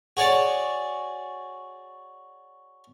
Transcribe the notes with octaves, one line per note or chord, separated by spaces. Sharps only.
F#4 G#4 C#5 D5